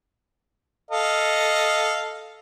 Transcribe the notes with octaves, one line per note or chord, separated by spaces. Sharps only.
A4 D#5 F5